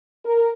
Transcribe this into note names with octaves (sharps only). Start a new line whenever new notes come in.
A#4